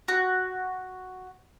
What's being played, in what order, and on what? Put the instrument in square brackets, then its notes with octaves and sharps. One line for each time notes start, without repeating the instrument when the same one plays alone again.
[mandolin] F#4